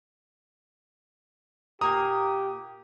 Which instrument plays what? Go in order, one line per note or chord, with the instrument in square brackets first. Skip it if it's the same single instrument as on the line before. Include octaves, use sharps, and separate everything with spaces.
[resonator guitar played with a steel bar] A#2 A#3 A#5 [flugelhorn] G4 [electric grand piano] D#6